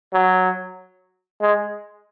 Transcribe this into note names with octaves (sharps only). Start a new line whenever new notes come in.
F#3
G#3